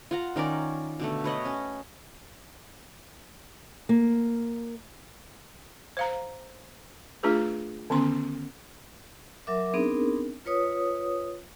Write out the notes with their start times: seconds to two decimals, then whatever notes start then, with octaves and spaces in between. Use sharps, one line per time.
0.11 F4 F#5 A#5
0.36 D#3 C#4 A#4 D5
1.00 B2 D3 A3
1.24 B4 C#5 D#5 F#5
1.45 C#4
3.89 A#3
5.97 C5 F5 A#5
7.23 A3 D4 F4 G#4 B4
7.90 D3 D#3 B3 C#4 C6
9.47 F#3 A#4 E5 D6
9.74 B3 C4 D4 D#4 G#4 A#4
10.45 F4 B4 C#5 D#6